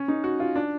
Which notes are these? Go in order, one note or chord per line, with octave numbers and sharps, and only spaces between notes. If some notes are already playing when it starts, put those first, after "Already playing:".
Already playing: C#4
D#4
F#4
F4
D4